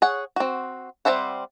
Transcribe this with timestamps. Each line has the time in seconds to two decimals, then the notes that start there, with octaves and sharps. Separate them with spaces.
0.02 G#4 C#5 F#5
0.36 C4 F#4
1.05 G3 C4 C5 E5 F#5